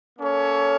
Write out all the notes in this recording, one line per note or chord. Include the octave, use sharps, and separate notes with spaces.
A#3 C#4 A4 C#5